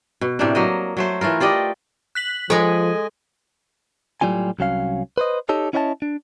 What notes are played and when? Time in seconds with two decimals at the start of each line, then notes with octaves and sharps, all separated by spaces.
0.21 B2
0.39 A2 C3 A#3 D4
0.55 F#3 A#3 D#5
0.97 F#3 A3 C5
1.21 E3 A3 F4 A#4
1.40 F4 G4 D5 D#5
2.15 F#6 B6 F#7
2.50 F3 G#3 A4 C#5 D#5 G#5
4.21 A2 F#3 G3 C4 F4 G#5
4.59 C2 F#3 C#4 F5
5.18 B4 C5 D#5
5.49 D#4 G4 A4 C#5 D#5
5.73 C#4 E4 C#5 D#5 F5 A5
6.02 D4